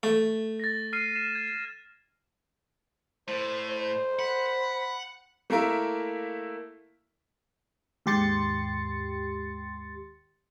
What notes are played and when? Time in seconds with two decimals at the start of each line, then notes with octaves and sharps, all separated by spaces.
0.03 A3
0.60 A6 A#6
0.93 F6 C7 D#7
1.15 C7 E7
1.35 G#6
3.28 A2 C5
3.70 C5
4.19 F#5 B5
5.50 A3 A#3 E4 A#4 E5
8.06 D#2 G#2 G4 C6 A6 C#7